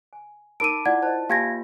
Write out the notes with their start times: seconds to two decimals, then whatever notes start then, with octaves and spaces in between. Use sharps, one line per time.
0.13 G#5
0.60 D#4 A#4 A5 B5 D6 E6 D7 D#7
0.85 E4 F4 D5 F#5 G#6
1.02 C5 D#5 A5
1.30 A#3 F4 G4 F5 G5 G#5 G#6 A#6